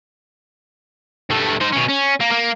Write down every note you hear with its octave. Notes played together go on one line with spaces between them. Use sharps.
G2 A3
D#4 C5
B2 C#4
C#4
A#3
A#3